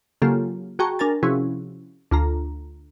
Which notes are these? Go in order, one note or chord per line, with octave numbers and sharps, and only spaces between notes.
C#3 F#3 A#3 F4 G4 A4
F#4 G#4 G5 A5 A#5 C#6
D4 A#4 G#5 A6
C3 F3 C#4 E4 F#4 G#4
D2 F4 A#5